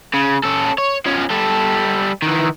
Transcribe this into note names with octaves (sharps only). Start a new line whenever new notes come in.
C#3
C#4 A4
C#5
F3 C#4
G3 A4
D#3 E3